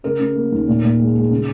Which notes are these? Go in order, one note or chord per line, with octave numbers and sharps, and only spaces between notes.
C#3 A#4
C#3
A#3
D#2
A#2
A#2
G#3
G#3
C#3